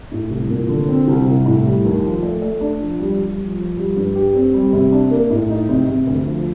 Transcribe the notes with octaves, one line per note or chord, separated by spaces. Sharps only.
A2
C2
A#2
D3
C4
C2
C2
A2
G3
D#2
F3
A3
A3
D4
F3
G3
G3
F3
F3
G3
G2
G4
C4
G3
C3
D4
A#3
A2
D#4
C3
C3
D2
F3